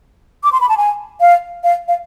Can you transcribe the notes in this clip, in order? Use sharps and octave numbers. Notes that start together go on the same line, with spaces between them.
D6
C6
B5
A5
G#5
F5
F5
F5